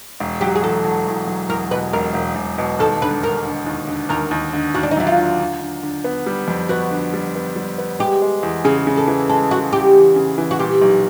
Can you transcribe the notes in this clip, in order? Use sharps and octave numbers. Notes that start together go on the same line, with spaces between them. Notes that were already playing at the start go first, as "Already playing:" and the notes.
E1
F#3 G4
G#4
E2 A4
F#3
E2
F#3
E2 A#4
B2 B4
E1 A#4
E1
E1
B2
D#2 A4
D3 B4
D3 A#4
D3
D#2
D3
D#2 A#4
D#2
D3
D#2 F#4
D4
D#4
F#3 E4
F4
D3
D3
D3
D3
B3
G3
F2
B3 F#4
D3
G3
B3
G3
B3
G#3 G4
G#3
E2
C#3 G#4
C#3
A4
E3
G#3 A4
G#3 F#4
E2 G4
E2
C#3
E3
F#4
A#2 G4
B1